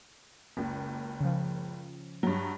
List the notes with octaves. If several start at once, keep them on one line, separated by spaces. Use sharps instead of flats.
F#1 C#2
C#3 F3
G2 F#3